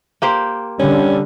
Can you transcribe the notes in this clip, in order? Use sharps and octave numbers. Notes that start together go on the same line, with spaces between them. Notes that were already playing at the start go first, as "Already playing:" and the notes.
A#3 G4 C5
D3 G3 C#4